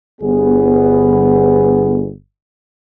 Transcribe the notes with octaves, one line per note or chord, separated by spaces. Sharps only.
G1 B3 G#4